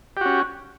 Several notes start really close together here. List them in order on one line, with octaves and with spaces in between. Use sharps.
G4 F#4 C#4